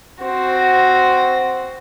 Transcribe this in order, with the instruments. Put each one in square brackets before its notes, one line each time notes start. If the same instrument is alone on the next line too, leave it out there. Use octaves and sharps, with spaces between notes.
[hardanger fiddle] C4 F#4